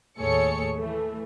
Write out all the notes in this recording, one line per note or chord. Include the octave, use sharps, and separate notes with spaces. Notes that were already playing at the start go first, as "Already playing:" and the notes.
D#2 A2 G#4 A4 C#5 C#7
E3 A3